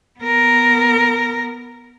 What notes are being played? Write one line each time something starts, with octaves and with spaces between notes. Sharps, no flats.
B3 A#4